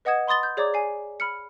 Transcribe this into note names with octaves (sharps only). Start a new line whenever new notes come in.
B4 D#5 F#5 D#6 G#6 E7
B5 C6 D#6 A6 G7
G6
G#4 C#5 D5 A#5 D6 G#6
G#5 C7
B5 F6 C#7